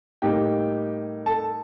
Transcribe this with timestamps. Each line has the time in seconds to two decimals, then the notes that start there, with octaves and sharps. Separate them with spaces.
0.22 A2 G3 A#3 D#4 G4 G5
1.26 A4 A5